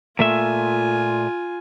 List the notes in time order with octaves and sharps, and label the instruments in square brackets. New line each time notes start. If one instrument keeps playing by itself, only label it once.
[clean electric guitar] A#2 A3 E5 [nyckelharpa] F4 G#5